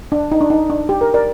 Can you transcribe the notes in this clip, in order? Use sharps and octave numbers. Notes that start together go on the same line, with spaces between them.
D4
D#4
D4
D#4
D4
G4
A#4
A#4 D5